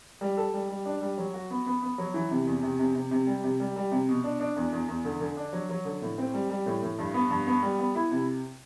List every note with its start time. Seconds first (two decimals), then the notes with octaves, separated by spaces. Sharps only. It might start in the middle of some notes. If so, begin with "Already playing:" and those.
0.21 G3
0.37 A4
0.54 G3
0.69 G3
0.85 D4
1.01 G3
1.18 F#3
1.34 F#4
1.50 B3
1.66 B3
1.82 B3
1.98 F#3
2.14 E3
2.31 C3
2.47 E2
2.63 C3
2.79 C3
2.95 C3
3.11 C3
3.27 G3
3.44 C3
3.60 G3
3.76 G3
3.91 C3
4.09 B2
4.24 D4
4.40 D4
4.56 E2
4.73 E2
4.88 E2
5.05 D3
5.21 D3
5.37 D4
5.53 F#3
5.69 F#3
5.85 D3
6.02 A2
6.18 C4
6.34 G3
6.50 G3
6.66 A2
6.83 A2
6.98 G2
7.14 B3
7.30 G2
7.47 B3
7.63 G3
7.79 B3
7.95 E4
8.11 C3